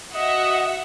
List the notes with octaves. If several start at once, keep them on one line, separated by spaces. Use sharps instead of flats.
F#4 D#5 E5 F#5